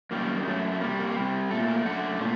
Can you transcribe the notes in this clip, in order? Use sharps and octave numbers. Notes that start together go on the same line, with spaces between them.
F#2 D#3 G3 A#3
F#2 F#3 A3
A3
C3 G3 A#3
A#3
C3 G3
A#2 A3 A4
A#4
F#2 D3 A3 F#5
A#2 A3